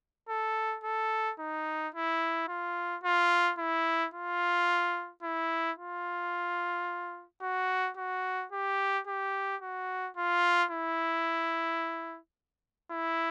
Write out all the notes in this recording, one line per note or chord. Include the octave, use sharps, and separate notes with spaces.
A4
A4
D#4
E4
F4
F4
E4
F4
E4
F4
F#4
F#4
G4
G4
F#4
F4
E4
E4